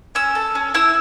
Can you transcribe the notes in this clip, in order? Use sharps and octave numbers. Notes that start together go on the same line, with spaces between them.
C#4 E6
A4
C#4
E4 E6